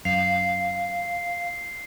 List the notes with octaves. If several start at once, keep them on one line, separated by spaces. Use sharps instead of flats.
F#2 F5 C7